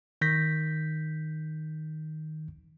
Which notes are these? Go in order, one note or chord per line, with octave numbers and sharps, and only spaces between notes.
D#3 G6 A#6 B6